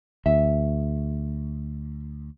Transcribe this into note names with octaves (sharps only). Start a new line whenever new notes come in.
D2 E5